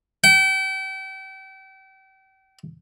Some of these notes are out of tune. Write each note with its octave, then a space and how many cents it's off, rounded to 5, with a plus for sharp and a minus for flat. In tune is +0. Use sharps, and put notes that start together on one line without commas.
G5 -35